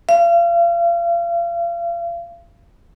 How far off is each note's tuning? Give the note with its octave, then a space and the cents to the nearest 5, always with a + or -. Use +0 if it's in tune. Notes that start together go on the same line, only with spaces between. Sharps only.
F5 -35